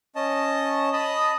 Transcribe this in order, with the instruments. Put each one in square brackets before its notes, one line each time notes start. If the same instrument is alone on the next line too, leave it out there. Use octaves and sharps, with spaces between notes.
[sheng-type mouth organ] C#4 D#5 A5
[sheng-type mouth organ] D#5 A5 B5 [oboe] D#6